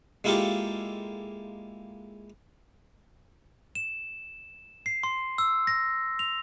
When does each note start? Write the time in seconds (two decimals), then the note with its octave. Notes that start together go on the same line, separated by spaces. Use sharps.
0.24 G#3 A#3 E4 F4 G4 A4
3.75 E7
4.86 C7
5.03 C6
5.38 E6
5.67 A#6
6.19 F7